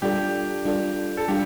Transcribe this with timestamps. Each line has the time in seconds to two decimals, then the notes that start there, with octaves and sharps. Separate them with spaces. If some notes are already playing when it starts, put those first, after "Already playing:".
0.02 G3 D4 F4 G4 A4 D5
0.65 G3 D4 F4 A4 D5
1.17 A4
1.28 G3 D4 F4 G4